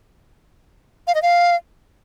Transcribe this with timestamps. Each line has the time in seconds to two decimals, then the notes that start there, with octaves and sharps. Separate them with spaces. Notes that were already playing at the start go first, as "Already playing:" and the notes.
1.07 F5
1.15 D#5
1.22 F5